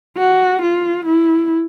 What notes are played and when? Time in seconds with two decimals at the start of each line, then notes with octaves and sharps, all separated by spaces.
0.18 F#4
0.62 F4
1.06 E4